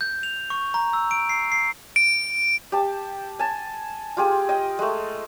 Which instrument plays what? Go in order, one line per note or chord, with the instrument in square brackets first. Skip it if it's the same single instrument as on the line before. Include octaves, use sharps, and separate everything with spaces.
[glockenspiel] G6
F7
C#6
A#5
E6
D7
C7
C7
[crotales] D7
[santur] G4 A5
G#5 A5
F4 G4 G#4
D#5 G5
G#3 A3